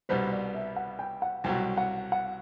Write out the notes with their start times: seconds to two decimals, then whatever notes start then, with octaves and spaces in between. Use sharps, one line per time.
0.09 C2 B2 G3 B3 C5
0.32 D5
0.54 E5
0.76 F#5
0.99 G5
1.22 F#5
1.44 C2 B2 F#3 G5
1.77 F#5
2.12 F#5